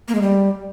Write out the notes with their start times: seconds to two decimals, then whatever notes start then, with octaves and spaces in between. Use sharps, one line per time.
0.08 A#3
0.15 G#3
0.22 G3